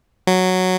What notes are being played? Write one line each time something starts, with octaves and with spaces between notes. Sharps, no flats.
F#3